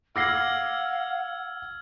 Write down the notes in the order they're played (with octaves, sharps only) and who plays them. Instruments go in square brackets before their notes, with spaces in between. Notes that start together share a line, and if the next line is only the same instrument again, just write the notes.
[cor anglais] F5 [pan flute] F#5 [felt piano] D6 A#6 C7 [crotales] E6 F6 G#6